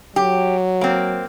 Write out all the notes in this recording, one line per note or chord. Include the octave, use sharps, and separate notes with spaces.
F#3 G4
A#3 C4